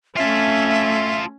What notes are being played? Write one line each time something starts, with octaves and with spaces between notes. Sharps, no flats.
A3 C#4 F4 A4 E5